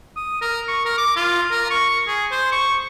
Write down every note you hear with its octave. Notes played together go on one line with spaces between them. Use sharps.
D#6
A#4
C#6
A#4
D6
F4
A#4
C#6
G#4
C5
C#6